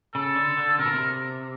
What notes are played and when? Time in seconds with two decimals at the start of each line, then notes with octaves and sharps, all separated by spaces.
0.14 C#3 A4
0.36 D3
0.57 D3
0.78 C3 A#4
0.85 B2
0.93 C3